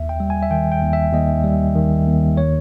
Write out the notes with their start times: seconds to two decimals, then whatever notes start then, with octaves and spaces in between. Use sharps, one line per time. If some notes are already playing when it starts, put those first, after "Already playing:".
Already playing: D#2 E5
0.09 G5
0.20 G3
0.30 G#5
0.43 E5
0.51 D#3 G5
0.72 G5
0.82 D#2
0.93 E5
1.13 D#2 D#5
1.44 G3
1.75 D#3
2.07 D#2
2.37 C#5